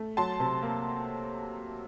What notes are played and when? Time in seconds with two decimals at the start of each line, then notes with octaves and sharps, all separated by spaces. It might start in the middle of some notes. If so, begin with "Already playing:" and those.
Already playing: A3
0.17 F#3 A5 C6
0.40 C3
0.62 A#3